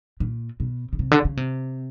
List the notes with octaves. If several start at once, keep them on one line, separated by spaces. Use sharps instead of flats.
A#2
B2
C#3
C3
D3
C#3
C3